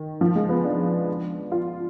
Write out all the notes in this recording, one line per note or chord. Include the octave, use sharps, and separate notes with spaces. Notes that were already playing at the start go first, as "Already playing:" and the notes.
Already playing: D#3
F3
G#3
B3
D4
F4